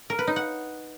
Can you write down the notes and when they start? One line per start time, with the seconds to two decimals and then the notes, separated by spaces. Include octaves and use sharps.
0.10 A#4
0.19 B4
0.27 D#4
0.36 F#5